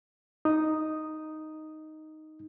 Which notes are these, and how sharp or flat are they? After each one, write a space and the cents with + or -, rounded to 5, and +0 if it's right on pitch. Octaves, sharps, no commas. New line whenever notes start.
D#4 +0 D#6 -5